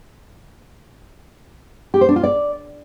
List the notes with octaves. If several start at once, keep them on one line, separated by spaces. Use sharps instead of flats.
G4
C5
D4
F4
D5